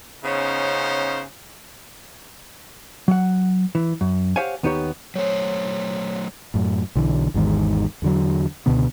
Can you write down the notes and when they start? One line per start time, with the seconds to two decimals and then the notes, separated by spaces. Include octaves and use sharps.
0.24 C#3 B3 C#4 D#4 C5
3.08 F#3 F#5
3.75 E3
4.01 F#2
4.36 G4 C5 C#5 F5 F#5 G#5
4.63 D#2 B3 D#4 G4 C#5
5.15 F#3 A3 C5 C#5
6.54 F#2 A2
6.95 B1 D3 E3
7.34 G#1 E2 G#2 D#3
8.02 E2 D3 F#3
8.66 C#2 B2 D3 B3